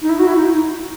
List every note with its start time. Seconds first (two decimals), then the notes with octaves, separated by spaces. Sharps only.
0.02 D#4
0.09 E4
0.19 F#4
0.27 E4
0.36 D#4